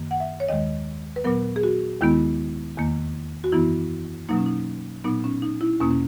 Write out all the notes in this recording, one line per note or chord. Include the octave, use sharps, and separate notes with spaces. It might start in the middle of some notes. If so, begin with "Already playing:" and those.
Already playing: F#2 D#3 A#3
F#5
E5
C#5
D#2 D#3 G#3 D#5
B4
A#2 F#3 B3 A#4
G#4
F#4
D#2 D#3 G#3 B3 E4
E2 D#3 A#3
F#4
F#2 E3 B3 E4
B2 F#3 A#3 D#4
C#4
D#4
A#2 F#3 B3 D#4
C#4
D#4
E4
E2 B2 A#3 C#4
C#4